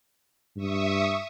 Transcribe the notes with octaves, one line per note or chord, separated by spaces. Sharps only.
G2 E5 C#6 D#6